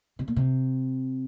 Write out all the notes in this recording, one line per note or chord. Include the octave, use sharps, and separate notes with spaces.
C3
A#2
C3